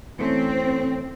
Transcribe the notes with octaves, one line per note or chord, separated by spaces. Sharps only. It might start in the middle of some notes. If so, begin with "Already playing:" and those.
E3 A3 C4 C#4